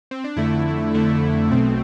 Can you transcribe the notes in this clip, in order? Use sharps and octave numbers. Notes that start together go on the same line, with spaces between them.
C4
D4
F2 D3 A3 E4
F2 D3 A3 E4
B1 B2 A3 C4